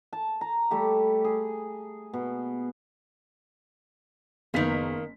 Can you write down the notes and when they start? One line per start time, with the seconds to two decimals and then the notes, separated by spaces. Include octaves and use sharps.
0.13 A5
0.41 A#5
0.71 G3 A3 G4
1.24 G#4
2.13 B2
4.54 F#1 D#3 A#3 B3 B6